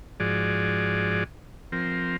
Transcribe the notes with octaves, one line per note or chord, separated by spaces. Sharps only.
G#2 F3 F#4 G#4 D5
F3 C4 A#4